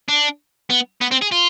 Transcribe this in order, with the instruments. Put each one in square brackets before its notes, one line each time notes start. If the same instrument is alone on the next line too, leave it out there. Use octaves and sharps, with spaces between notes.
[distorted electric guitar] D4
B3
B3
C4
G#4
F4